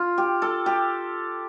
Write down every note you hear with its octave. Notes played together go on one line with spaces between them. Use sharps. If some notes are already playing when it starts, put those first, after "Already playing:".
Already playing: F4
G4
A4
G4